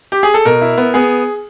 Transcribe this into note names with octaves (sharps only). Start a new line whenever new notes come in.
G4
G#4
A4
B2 A#4
E4
B3
B3 G#4